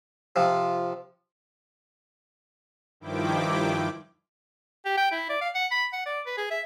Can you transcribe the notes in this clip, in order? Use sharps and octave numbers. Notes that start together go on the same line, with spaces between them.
C3 F3 F4
G2 D#3 F3 E4 G5 D6
G4
G5
E4
D5
F5
F#5
B5
F#5
D5
B4
G#4
E5